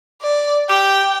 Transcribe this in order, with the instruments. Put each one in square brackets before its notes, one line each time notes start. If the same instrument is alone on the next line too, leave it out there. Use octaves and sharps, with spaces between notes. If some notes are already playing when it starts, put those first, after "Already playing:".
[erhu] D5
[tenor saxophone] G4 [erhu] G5